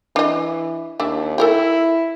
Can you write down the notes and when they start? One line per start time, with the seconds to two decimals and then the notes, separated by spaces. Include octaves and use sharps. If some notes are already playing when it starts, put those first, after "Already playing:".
0.16 E3 D4 D#5
1.00 D#2 D4 E4
1.38 E4 A4 A#4 G5